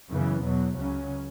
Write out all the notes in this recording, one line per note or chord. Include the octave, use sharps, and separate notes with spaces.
F#2 C#3 E3 B3
E2 B2 F#3
C#2 C#3 F#3 C#4